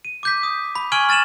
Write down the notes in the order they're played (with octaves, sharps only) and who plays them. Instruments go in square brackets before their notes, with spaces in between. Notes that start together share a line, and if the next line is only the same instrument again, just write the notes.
[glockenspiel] D#7
D6 G6 B6
D#6
B5
G#5 C#6 F6 G#6 D#7 F#7
F6 A6 D#7 E7 F#7